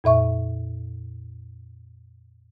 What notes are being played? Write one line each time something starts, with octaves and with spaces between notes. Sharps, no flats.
F2 A#2 E5 C#6